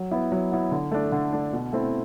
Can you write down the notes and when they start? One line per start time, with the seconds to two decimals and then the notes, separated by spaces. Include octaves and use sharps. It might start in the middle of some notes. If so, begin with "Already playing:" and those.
Already playing: F#3
0.11 B3 E4
0.32 F#3
0.52 B3 E4
0.72 D3
0.92 A3 D4
1.12 D3
1.33 A3 D4
1.53 B2
1.73 A3 C4 E4